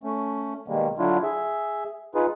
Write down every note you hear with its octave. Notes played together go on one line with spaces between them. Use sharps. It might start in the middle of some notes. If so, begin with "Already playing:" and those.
A3 C#4
B2 D#3 G3 G#3 A#3
D3 F#3 D4 E4 F4
G#4 E5
D#4 F4 G#4 B4